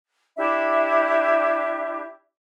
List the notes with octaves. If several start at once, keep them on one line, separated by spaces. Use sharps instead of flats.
D4 E4 G4 E5